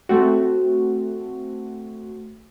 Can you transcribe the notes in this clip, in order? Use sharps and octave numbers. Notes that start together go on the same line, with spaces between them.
A3 C4 F#4